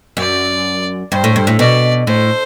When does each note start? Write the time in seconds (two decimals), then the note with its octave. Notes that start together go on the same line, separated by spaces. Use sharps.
0.17 F#2 D5
1.12 G2 C5
1.24 A2
1.36 G2
1.47 A2
1.59 B2 D5
2.07 A2 C5